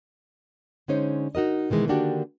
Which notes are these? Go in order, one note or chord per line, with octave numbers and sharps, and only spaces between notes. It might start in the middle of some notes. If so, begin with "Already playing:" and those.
D3 G#3 C#4 D#4 C5 C#5
D#4 F#4 A#4 D#5
B2 D#3 E3 G#3
D3 D#3 A#3 D4 F#4 G4